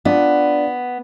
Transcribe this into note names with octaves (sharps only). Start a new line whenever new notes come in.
B3 D4 F4 D5